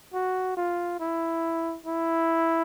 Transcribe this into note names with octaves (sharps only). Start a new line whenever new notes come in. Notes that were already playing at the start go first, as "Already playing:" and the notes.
F#4
F4
E4
E4